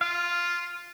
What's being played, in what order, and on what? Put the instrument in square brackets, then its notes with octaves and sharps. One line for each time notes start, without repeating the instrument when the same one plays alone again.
[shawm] F4 [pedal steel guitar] F5